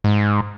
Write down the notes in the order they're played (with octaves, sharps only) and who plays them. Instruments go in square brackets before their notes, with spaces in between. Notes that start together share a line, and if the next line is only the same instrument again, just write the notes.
[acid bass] G#2